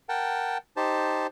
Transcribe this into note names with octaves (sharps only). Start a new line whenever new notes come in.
A#4 F#5 G5 A5
D#4 G4 C5 A5